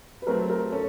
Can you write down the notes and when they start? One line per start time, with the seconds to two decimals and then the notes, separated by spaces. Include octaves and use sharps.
0.22 B4
0.27 F#3 A3 C4 A#4
0.50 A#4
0.72 C#4 A4